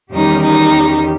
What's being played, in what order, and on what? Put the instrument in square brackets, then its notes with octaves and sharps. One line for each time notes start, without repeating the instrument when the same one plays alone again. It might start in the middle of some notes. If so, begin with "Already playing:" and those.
[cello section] E2 D#3 G3 C#4 G4 [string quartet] D#4
[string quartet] D#4